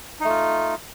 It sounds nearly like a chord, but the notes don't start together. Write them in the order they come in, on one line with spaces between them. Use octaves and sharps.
D#4 A3 F4